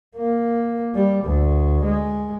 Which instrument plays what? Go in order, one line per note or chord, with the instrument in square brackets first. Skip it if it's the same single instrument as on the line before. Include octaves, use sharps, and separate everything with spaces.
[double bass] A#3
G3
D2
G#3